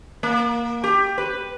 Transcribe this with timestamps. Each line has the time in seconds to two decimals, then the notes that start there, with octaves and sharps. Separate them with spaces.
0.23 A#3
0.84 G4
1.18 B4